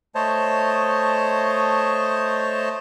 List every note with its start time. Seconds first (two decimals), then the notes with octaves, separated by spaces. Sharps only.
0.15 A3 C5 C#5 D#5 A5